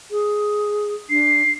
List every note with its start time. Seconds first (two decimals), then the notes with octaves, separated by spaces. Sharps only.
0.11 G#4
1.10 D4 C7